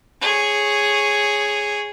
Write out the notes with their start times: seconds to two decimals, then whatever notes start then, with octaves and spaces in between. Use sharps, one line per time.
0.21 G#4 C#5